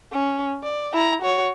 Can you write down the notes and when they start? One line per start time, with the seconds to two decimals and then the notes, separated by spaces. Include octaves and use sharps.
0.12 C#4
0.63 D5
0.93 E4 A#5
1.22 F#4 C#5